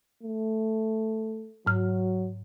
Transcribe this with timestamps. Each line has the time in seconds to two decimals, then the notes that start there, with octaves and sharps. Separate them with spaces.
0.23 A3
1.66 G#2 F#3 F6